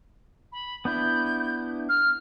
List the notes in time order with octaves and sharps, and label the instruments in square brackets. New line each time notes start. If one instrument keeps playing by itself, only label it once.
[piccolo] B5
[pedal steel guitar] B3 D4 E4 [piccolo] G6
[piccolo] F6